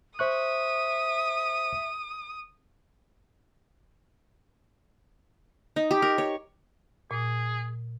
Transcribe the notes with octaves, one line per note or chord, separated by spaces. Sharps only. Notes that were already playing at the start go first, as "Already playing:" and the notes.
C5 E5 C#6 D#6 F#6
D#4
G4
A#4
C#5
A#2 G#4